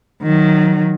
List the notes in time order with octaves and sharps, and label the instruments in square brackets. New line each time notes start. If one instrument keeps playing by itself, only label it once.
[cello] D#3 F#3